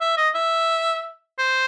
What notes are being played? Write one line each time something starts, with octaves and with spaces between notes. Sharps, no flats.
E5
D#5
E5
C5